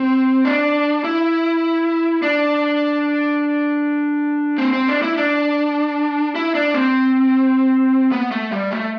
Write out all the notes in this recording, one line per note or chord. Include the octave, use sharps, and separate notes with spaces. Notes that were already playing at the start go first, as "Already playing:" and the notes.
Already playing: C4
D4
E4
D4
C4
C4
D4
E4
D4
E4
D4
C4
B3
A3
G3
A3